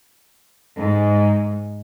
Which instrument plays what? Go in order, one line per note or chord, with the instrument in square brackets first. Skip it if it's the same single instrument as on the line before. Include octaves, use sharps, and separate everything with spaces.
[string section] G#2